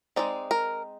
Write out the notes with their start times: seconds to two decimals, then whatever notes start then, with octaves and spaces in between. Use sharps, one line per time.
0.16 G#3 C4 D#4 D5
0.51 A#4